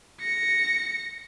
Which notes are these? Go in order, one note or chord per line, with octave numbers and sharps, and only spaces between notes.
A#6 C#7